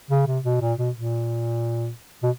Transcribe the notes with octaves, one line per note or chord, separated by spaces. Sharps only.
C#3
C3
B2
A#2
B2
A#2
B2